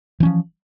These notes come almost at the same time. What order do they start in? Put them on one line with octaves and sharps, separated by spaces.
E3 C#4 F3